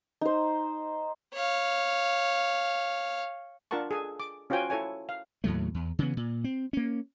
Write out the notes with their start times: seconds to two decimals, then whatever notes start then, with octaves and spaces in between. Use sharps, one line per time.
0.21 D#4 C5
1.34 C#5 F5
3.71 D4 F4 A#4 F#5 A5 C#6
3.91 G#4 A4 G#5
4.20 D6
4.50 C#4 F4 F#4 C5 G5 G#5
4.70 E4 A4 C#5 G#5
5.09 F5
5.44 D#2 A2 F#3 A3
5.74 E2
5.99 C#3 E3 B3
6.17 A#2
6.44 C4
6.73 A#3 C#4